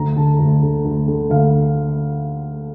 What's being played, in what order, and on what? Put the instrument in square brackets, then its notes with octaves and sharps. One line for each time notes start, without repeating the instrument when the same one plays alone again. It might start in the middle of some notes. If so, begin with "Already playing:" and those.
Already playing: [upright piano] D2 A#5
D3 A5
D2
D3
D2
D3
D2 F5